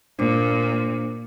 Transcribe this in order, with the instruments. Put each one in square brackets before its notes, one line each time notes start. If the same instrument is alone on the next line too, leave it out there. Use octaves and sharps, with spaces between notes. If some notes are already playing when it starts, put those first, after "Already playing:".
[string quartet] A#2 [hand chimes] D4 C5 D6